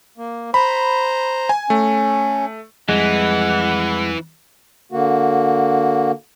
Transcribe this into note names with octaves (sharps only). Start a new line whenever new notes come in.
A#3
C5 A#5 B5
G#5
A3 C#4
F2 E3 G3 G#3 F#5
D3 A#3 F#4